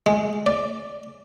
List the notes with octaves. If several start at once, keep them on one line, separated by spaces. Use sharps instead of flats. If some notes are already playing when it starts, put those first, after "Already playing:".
G#3
D5